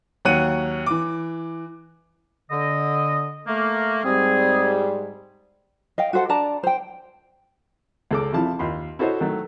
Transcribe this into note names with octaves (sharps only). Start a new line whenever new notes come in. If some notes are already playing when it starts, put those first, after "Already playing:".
D#2 F#3 C#5 F#5 F#6 D#7
E3 D6
D3 D#5
A3 A#3
G#2 G3 C4 G#4
D#5 F5 G5
F#4 A4 C5 F#5
D4 D5 A5 A#5
C5 G5
C#2 A4 D6
C3 E3 F3 E4 A5
D#2 F4 B5 C6
E4 F#4 A4 C5 C#5 D#5
D#3 F#3 A3